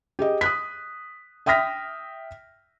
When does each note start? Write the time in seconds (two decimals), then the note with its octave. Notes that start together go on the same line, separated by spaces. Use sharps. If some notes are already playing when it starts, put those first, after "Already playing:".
0.19 G4 G#4 D#5
0.41 D#6 F#6 B6
1.46 E5 G5 D#6 F6 A#6 B6